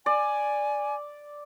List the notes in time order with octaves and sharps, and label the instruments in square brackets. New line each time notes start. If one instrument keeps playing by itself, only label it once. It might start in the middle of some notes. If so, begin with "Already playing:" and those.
[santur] D5 [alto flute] G#5